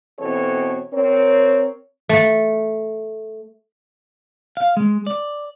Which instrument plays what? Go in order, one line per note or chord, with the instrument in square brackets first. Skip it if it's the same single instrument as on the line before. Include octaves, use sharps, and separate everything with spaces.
[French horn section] B2 E3 C4 A4 C#5
C4 A#4 C#5
[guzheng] A3
[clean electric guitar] F5
G#3
D5